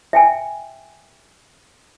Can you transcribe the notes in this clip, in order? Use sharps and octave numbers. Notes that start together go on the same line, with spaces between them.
E5 G5 G#5